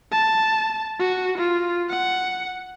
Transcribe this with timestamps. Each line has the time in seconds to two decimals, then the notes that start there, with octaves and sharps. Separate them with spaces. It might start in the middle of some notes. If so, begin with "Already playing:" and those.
0.12 A5
1.00 F#4
1.38 F4
1.89 F#5